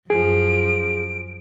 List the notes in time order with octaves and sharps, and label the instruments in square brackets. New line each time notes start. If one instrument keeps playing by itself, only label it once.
[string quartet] F#2 F3 [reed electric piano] G#4 [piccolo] D7